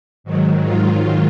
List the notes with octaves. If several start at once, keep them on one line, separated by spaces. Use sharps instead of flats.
G#2 D#3 F#3
F4